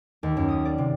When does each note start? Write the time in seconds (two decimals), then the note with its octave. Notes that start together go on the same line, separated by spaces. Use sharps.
0.23 D#2
0.37 F#2
0.48 D#6
0.65 D5
0.78 C3